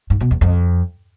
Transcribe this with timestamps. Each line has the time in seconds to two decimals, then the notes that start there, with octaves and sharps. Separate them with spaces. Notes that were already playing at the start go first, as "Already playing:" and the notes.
0.10 G#2
0.20 B2
0.31 E2
0.41 F2